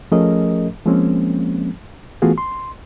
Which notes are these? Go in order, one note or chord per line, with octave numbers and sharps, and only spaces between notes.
F3 A3 C#4 G#4 A#4 D#5
F3 G#3 A#3 C4 C#4
E3 A3 B3 F4 F#4 G#4
C6